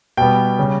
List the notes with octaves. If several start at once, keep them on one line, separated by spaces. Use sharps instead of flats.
B2 G3 B3 G5
C#3 G3 C#4